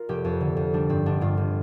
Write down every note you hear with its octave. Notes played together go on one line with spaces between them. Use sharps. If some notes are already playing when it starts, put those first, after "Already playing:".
Already playing: F4 A#4 D5
F1 G4
F2
D3
F2
G3 D4
G2 C4
G1 D4
G2 F4
G1